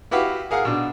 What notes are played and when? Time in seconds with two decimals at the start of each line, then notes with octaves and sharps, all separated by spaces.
0.11 E4 F#4 G4 B4 F5
0.51 G#4 A#4 F5 F#5
0.65 B2 D4